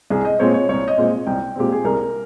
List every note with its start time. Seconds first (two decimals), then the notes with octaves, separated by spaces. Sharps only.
0.10 C2 G#4
0.25 D#5
0.39 A#2 G#3 C4 C#5
0.54 C#5
0.69 C2 C#5
0.88 D#5
0.97 A#2 G#3 C4
1.27 C2 G5
1.56 A#2 G#3 C4 G4
1.72 G#4
1.84 C2 A#4